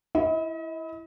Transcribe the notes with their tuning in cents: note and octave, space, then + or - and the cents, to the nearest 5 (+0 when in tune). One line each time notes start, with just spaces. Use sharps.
E4 +5 D#5 +45